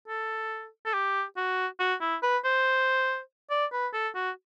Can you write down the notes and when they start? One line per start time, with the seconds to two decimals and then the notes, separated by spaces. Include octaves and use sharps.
0.08 A4
0.85 A4
0.93 G4
1.37 F#4
1.80 F#4
2.01 E4
2.23 B4
2.44 C5
3.50 D5
3.72 B4
3.93 A4
4.15 F#4